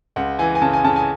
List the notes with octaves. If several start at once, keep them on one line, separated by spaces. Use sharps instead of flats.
C#2 F#5
E3 G#5
G#5
C#3 A5
G#5
C#3 A5
G#5